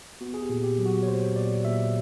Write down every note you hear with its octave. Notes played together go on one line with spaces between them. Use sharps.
B3 F#4
G#4
G4
A#2
G4
F#3
F#4
C#5
A#2 C5
A#2 D5
A#2 E5